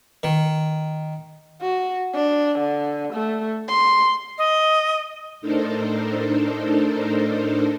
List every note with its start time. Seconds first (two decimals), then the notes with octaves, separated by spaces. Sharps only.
0.23 D#3
1.61 F#4
2.14 D4
2.59 D3
3.13 A3
3.68 C6
4.38 D#5
5.41 A2 D4 D#4 A4 A#4 C5